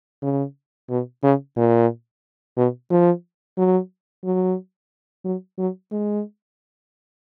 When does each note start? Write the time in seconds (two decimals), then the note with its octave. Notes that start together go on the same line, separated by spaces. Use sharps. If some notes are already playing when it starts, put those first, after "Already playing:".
0.23 C#3
0.90 B2
1.23 C#3
1.57 A#2
2.57 B2
2.90 F3
3.58 F#3
4.24 F#3
5.25 F#3
5.58 F#3
5.92 G#3